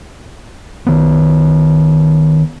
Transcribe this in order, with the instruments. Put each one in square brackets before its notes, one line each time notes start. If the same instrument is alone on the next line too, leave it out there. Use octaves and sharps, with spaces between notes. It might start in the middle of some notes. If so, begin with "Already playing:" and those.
[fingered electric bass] D#3 B3